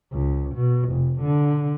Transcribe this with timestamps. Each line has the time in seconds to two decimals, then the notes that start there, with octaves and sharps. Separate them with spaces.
0.12 C#2
0.54 B2
0.89 F1
1.21 D3